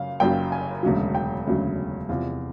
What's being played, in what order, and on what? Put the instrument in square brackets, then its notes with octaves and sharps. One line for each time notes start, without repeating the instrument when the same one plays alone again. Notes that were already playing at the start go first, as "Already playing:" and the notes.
Already playing: [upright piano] F#2 C#3 F5
F#1 F#2 C#3 F#3 G5
G#5
E1 D2 C#3 F#3
G5
E1 D2 C#3 F#3
E2 C3 F3 F5